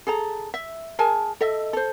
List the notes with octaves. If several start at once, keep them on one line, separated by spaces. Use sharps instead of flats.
G#4 A4 A#5
E5
G#4 A#4 G#5 A5
A4 D#5 E5
A4 C5